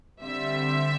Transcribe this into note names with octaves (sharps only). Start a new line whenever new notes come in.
D3 G3 C4 E5